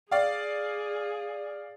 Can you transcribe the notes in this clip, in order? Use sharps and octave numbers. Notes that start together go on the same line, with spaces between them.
G#4 D5 F5